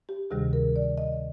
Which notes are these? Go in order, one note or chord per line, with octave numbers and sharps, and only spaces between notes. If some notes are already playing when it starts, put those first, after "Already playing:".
G4
D2 C3 D#3 G3 G#4
A#4
D5
D#5